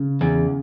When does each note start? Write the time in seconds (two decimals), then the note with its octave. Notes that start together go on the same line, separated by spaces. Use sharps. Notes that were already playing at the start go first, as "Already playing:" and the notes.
Already playing: C#3
0.21 E2